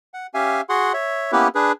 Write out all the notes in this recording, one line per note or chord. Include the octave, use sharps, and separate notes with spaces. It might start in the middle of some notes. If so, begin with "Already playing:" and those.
F#5
C#4 G4 E5 F5 G#5
F#4 G#4 F#5 C6
C#5 E5
A#3 B3 C#4 E4 G4 B4
D4 G#4 B4